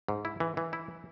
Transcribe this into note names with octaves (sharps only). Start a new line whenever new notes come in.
G#2
E4
E3
E3
E4